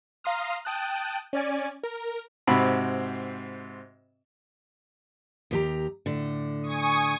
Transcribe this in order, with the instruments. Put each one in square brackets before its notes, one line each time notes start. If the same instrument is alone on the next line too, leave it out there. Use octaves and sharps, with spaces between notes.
[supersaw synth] F5 A#5 C6 D#6 F6
G5 A5 D#6 F#6
C#4 D5 G#5
A#4
[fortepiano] G#2 C3 C4 F#4 B5
[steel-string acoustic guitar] D#2 G4 A#5
A2 D3
[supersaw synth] G#5 C#6 D#6